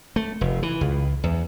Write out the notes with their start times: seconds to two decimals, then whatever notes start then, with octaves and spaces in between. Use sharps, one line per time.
0.16 A3
0.41 F1
0.63 E3
0.81 C#2
1.24 E2